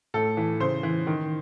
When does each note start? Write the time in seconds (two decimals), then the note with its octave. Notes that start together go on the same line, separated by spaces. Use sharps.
0.14 A2 A4
0.37 E3
0.60 C#3 C5
0.83 E3
1.07 D#3